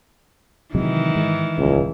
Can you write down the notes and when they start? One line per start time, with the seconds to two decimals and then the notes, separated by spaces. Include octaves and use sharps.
0.75 C3 D#3 E3 F#3 G#3
1.15 G#2 G#3
1.58 D#1 C#2